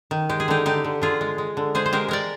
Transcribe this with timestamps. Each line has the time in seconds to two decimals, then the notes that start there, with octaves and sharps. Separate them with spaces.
0.11 D#3
0.29 G#3 G4
0.40 G#4
0.48 D3 D#4 G4
0.66 D3 D#4 G4
0.84 D3
1.02 D3 F4 G#4
1.21 G#3
1.38 G#3
1.57 D3
1.75 G#3 G#4 C5
1.86 C5
1.93 G#3 G4 A#4
2.08 G#3 A#4 D5